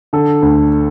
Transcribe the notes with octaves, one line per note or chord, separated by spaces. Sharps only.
D3 A4
D2